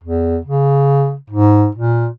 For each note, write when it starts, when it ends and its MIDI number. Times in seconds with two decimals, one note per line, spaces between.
0.04 0.38 40
0.44 1.15 49
1.30 1.68 44
1.75 2.07 46